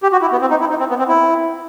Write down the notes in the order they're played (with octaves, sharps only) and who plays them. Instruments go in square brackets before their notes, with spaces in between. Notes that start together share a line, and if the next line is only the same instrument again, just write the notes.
[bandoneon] G4
F#4
E4
B3
C4
D#4
E4
D#4
C4
B3
C4
E4